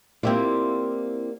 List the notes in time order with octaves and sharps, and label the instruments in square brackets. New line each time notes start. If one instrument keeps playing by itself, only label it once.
[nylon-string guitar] A#3 G4 D5 [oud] C4 E4 F4